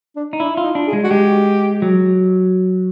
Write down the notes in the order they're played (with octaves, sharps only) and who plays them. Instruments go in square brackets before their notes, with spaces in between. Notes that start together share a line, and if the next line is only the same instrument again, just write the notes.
[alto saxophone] D4
[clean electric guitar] D#4
[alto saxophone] D4 [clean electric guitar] E4
[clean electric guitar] F4
[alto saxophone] D#4
[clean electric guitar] D4
[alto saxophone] G#4
[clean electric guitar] G#3
[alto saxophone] F#4
[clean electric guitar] G#3 [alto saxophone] G4
[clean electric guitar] F#3